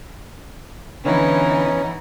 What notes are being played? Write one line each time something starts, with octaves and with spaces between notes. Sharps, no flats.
D3 E3 B3 C#4 D#4